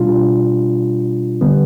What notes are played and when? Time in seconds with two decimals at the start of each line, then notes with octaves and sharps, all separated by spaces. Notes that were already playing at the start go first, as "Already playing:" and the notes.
Already playing: B2 G3 D4 F4
1.41 D3 G3 B3